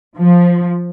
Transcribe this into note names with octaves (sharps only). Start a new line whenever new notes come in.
F3